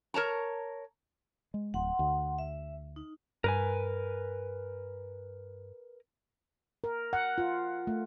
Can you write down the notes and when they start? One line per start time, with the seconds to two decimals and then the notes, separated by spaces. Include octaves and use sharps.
0.14 A#4 C#5 A5 A#5
1.54 G#3
1.74 D1 F#5 C6
1.99 D2
2.38 E5
2.96 D#4
3.44 G2 A#4 B4 G#5
6.84 A#4
7.13 F#5
7.38 F4
7.87 A3